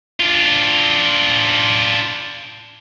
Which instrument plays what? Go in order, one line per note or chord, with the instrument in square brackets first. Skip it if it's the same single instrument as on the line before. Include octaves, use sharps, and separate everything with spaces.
[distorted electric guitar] D4 F4